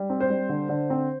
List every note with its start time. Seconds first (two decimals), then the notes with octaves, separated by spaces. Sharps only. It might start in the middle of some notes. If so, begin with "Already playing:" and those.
Already playing: G3
0.10 C4
0.20 C5
0.30 G3
0.49 D3
0.69 D3
0.90 C4